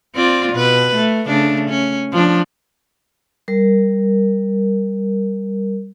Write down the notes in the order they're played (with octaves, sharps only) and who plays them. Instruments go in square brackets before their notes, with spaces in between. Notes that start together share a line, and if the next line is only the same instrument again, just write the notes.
[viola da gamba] C4 F4 D5
B2 B4
A3
C#3 A3 D4
C#4
F3 D4
[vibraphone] G3 A#4